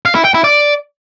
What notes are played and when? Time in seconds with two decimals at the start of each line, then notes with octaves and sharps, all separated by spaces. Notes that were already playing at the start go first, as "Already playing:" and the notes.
0.06 F5
0.15 E4
0.25 G5
0.34 E4
0.44 D5